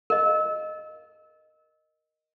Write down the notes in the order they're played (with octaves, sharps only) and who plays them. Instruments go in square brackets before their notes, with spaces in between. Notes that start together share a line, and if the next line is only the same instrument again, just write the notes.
[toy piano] A#4 D#5